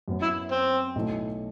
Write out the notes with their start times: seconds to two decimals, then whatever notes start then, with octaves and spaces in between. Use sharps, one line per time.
0.08 F#2 F#3 B3
0.22 E4
0.51 C4
0.95 B1 B2 A3 E4